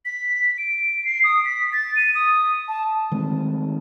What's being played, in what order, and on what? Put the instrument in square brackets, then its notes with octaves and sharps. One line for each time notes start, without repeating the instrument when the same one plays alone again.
[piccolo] B6
D7
C7
D#6
B6
A6
D#7
D#6
A5
[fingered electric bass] D#3 G#3 A3 C4